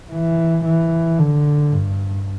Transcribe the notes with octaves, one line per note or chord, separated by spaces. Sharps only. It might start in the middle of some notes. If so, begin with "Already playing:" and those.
E3
E3
D3
G2